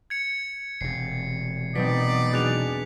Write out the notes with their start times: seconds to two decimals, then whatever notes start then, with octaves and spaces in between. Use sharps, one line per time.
0.10 G#6 C#7
0.81 E1 C3 C7
1.75 B2 F#3 B3 C4 D#4 D5 B6
2.33 D4 F#4 G#4 F#6 F7